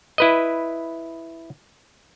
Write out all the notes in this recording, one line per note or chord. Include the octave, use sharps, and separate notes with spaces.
E4 B4 D#5